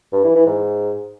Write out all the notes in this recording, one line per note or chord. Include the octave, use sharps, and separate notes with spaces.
G2
E3
E3
G#2